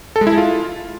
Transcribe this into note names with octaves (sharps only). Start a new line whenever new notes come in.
A4
G#3
E4
G#3
F4